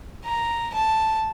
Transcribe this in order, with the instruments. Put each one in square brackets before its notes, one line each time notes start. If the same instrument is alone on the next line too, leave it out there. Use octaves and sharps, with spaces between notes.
[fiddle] A#5
A5